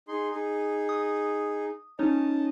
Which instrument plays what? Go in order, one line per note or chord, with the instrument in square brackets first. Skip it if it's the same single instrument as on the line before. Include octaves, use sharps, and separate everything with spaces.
[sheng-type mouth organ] D#4 G#4 C6
D#4 G#4
[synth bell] D#6
[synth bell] C#4 D#4 C#5 [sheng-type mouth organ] D#5 A5